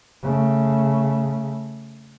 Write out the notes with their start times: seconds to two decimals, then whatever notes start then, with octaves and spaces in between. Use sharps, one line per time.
0.23 C#3 A3